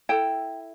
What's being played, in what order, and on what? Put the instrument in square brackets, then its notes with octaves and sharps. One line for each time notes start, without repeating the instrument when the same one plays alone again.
[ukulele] E4 A4 G5